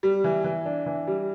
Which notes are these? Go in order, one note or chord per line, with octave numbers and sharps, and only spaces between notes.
G3
E3
E3
D4
E3
G3